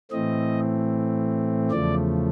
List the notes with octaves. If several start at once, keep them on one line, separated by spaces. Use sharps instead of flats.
A2 E3 A3 C4 D#5
E2 C#3 F3 A3 D5